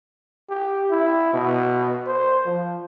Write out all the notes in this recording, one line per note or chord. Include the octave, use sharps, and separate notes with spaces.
G4
E4
B2
C5
F3